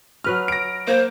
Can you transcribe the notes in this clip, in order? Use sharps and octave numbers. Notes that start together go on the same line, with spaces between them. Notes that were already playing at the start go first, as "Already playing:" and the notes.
F#3 B4 D#5 F6
A#6 D7
A#3 C5